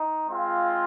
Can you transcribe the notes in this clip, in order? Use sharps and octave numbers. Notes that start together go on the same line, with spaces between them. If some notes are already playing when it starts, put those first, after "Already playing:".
Already playing: D#4
G#3 C4 F4